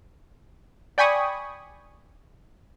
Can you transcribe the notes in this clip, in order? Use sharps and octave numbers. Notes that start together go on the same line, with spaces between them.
D5 G5 G#5 B5 C#6 D#6